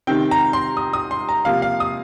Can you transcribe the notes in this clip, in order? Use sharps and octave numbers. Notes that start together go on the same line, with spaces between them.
C3 D#3 C4 G5
A#5
C6
D#6
D#6
C6
A#5
C3 F3 A#3 F5
F5
D#6